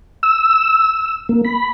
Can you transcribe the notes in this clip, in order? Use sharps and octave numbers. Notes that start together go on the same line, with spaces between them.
E6
A#3
B5